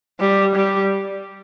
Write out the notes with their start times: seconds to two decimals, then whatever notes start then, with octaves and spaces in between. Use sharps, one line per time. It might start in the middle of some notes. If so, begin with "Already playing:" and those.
0.20 G3
0.56 G3